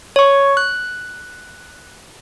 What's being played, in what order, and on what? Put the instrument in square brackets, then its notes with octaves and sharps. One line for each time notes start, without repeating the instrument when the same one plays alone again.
[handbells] C#5 C#6
F#6